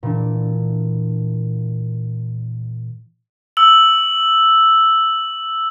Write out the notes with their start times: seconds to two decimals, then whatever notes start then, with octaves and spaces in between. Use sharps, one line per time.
0.03 A#2 E3 D4
3.57 E6 F#7